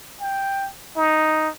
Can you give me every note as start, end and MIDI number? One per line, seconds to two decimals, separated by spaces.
0.21 0.69 79
0.97 1.49 63